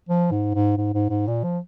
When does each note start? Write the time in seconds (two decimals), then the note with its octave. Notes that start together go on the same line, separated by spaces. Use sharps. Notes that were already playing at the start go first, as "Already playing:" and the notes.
0.09 F3
0.31 G#2
0.55 G#2
0.77 G#2
0.94 G#2
1.10 G#2
1.27 A#2
1.44 F3